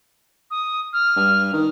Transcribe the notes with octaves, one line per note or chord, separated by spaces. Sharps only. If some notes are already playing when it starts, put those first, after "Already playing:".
D#6
F6
G2
D#3